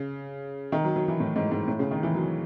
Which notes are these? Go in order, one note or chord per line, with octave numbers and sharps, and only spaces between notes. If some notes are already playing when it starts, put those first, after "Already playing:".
Already playing: C#3
D#3
F#3
F#3
E3
A2
G#2
G#2
A2
C#3
D#3
E3
F#3